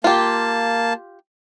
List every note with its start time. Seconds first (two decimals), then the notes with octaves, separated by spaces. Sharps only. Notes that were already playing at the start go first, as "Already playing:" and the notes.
0.04 A#3 F4 G4 A5